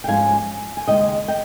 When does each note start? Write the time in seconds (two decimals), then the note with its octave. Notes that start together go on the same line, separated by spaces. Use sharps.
0.04 G5
0.08 G#2 F3 G#3 C#4 F5 G#5
0.77 G#5
0.88 D#2 C#3 G#3 D#5 G5
1.28 D#5 G5